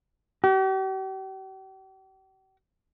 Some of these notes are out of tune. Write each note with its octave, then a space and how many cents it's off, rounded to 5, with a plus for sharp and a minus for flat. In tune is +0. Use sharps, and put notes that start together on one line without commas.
G4 -45